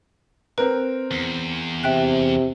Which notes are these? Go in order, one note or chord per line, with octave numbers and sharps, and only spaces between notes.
C4 A#4 B4
E2
C3 E5 G5 F#6